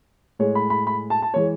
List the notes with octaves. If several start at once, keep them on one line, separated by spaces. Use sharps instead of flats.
A2 G#3 C#5
B5
B5
B5
A5
A5
E3 G#3 C#5